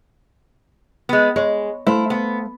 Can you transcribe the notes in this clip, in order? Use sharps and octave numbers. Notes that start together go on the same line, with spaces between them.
G#3 B3
G#3 C#5
A3 E4 C5 F5
B3